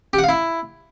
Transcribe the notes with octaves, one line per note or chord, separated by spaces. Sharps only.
G4
F#5
F5
E4